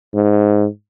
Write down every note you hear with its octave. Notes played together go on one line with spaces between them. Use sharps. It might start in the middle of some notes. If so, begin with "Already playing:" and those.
G#2